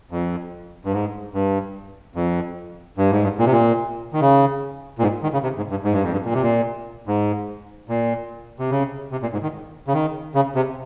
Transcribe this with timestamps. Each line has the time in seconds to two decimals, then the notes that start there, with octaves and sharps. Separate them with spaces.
0.11 F2
0.85 G2
0.93 G#2
1.34 G2
2.15 F2
2.98 G2
3.11 G#2
3.23 G2
3.38 A#2
3.46 C3
3.52 A#2
4.13 D#3
4.21 C#3
4.99 A#2
5.02 G#2
5.23 D#3
5.33 C#3
5.43 C3
5.57 G#2
5.70 G2
5.84 G#2
5.93 G2
6.03 F2
6.12 G2
6.25 A#2
6.34 C3
6.42 A#2
7.07 G#2
7.89 A#2
8.59 C3
8.71 C#3
9.12 C3
9.22 A#2
9.33 G#2
9.43 D#3
9.88 C#3
9.94 D#3
10.35 C#3
10.55 C3